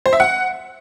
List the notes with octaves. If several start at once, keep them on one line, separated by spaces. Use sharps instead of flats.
C5
E5
F#5